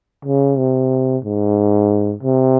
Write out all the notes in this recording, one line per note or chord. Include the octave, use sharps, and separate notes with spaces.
C#3
C3
G#2
C3